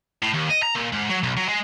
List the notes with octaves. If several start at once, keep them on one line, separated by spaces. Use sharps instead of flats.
A2
D#2
D#5
A#5
A#2
G#2
F#3
B1
F#3
G#3